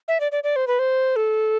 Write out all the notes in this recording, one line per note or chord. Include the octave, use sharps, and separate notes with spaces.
E5
D5
D5
D5
C5
B4
C5
A4